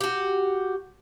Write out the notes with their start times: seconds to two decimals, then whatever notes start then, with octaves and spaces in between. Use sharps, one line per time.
0.01 F#4 G4